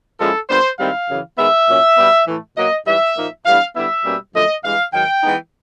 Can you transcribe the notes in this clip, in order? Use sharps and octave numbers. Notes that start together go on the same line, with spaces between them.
A#2 F3 G#3 C#4 E4 A4
A#2 G3 B3 D4 C5
G#2 D#3 G3 C4 E4 F5
F#2 C#3 E3
D#3 G#3 B3 E5
A#2 F#3 A#3 C#4
B2 G3 B3
A2 E3 A3
B2 F#3 A#3 D#5
G#2 E3 G3 E5
A#2 F3 A#3 D#4
A2 E3 G3 B3 D4 F5
D3 G3 B3 E4 E5
B2 G3 A#3 C#4
F#2 D3 F3 A3 D#5
G2 E3 G#3 F5
G#2 D#3 F#3 G5
E3 G#3 B3 D#4